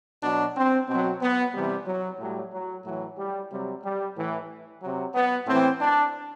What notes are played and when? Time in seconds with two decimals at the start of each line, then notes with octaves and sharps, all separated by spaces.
0.22 B2 F#3 D4
0.56 C4
0.88 B2 C4
0.93 F#3
1.21 B3
1.53 C3 E3 G3
1.86 F#3
2.20 A2 F#3 G3
2.53 F#3
2.85 A2 E3 F#3
3.18 G3
3.51 C3 F#3 G3
3.83 G3
4.16 A2 E3
4.82 C3 F#3
5.15 B3
5.47 A2 E3 C4
5.81 D4